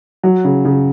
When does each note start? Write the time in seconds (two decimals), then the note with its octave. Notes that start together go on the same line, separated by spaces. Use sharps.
0.23 F#3
0.44 C#3
0.65 C#3